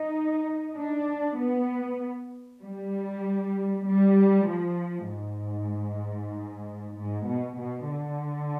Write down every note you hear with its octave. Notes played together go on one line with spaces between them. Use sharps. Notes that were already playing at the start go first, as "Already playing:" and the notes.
Already playing: D#4
D4
B3
G3
G3
F3
G#2
G#2
B2
B2
D3